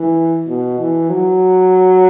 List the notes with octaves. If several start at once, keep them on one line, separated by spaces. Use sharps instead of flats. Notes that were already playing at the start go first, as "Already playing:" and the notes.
Already playing: E3
B2
E3
F#3